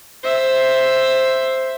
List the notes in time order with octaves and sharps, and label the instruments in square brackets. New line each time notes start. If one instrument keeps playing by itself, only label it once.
[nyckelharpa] C5 E5